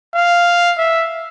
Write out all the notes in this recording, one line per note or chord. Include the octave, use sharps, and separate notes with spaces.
F5
E5